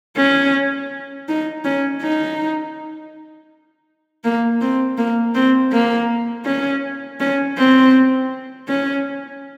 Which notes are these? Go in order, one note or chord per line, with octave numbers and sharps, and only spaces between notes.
C#4
D#4
C#4
D#4
A#3
C4
A#3
C4
A#3
C#4
C#4
C4
C#4